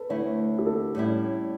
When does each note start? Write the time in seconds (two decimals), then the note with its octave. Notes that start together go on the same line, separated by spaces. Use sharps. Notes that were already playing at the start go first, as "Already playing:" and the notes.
Already playing: A4 B4
0.10 D2 D3 A3 E4 C#5
0.58 G4
0.66 A4
0.95 A2 G3 C#4 E4